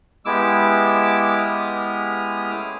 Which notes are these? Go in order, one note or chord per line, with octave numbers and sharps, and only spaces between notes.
G#3 B3 E4 G4 D6 E6
D#6 F6
F6
A3 C#4 E4 G#4 D6 E6